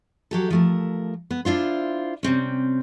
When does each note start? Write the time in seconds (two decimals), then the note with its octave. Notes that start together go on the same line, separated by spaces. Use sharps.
0.31 F#3 G4 A4
0.50 F3 A3 A#4
1.31 B3
1.45 D4 E4 F4 C5
2.23 C3 G3 C4 C#4